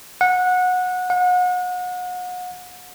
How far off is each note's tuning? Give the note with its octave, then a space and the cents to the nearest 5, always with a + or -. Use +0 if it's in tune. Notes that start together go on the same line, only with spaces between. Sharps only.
F#5 -20
F#5 -35